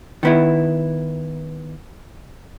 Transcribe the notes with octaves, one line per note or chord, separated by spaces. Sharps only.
D#3 B3 E4